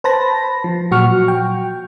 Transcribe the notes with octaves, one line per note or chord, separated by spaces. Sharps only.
B4 C5 A5 B5 A#6
F3
A#2 F#3 F#4 F#5 C#6 F6
G5